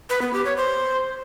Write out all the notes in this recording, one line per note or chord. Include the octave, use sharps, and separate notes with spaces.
B4
B3
G4
C#5
C5